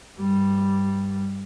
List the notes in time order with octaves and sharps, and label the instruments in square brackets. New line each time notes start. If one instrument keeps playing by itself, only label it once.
[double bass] G2 G3